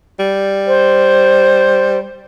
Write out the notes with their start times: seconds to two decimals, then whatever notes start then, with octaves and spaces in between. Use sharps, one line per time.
0.20 G3
0.67 C5